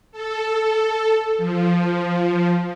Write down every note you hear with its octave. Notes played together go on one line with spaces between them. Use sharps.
A4
F3